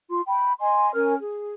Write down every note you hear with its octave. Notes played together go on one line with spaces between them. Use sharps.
F4 C6
G5 B5
D#5 G#5 C6
C#4 A#4 G#5 F6
G#4